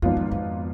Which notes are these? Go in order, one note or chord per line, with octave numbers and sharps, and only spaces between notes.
G#1 F2 G#2 F3 B3 F4
F2
F2